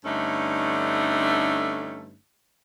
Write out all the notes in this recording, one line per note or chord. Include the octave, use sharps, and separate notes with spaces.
G2 D3 A3 C#4 D#4